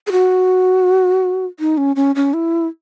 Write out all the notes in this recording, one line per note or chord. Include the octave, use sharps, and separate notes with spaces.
G#4
F#4
D#4
C#4
C#4
C#4
E4